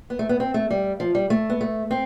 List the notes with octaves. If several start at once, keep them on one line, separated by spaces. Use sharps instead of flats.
B3
A3
B3
C4
A3
G3
F3
G3
A3
B3
A3
C4